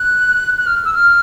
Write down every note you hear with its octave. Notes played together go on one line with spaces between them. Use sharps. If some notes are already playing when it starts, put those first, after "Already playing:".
Already playing: F#6
F#6
F6
E6
F6